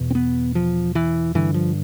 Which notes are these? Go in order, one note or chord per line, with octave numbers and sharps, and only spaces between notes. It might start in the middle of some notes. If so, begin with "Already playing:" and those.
Already playing: E2 B2
C4
B3
F3
E3
G2 D3 E3
F3